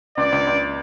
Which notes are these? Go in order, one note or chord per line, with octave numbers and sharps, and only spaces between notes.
C#2 D5
C#2
C#2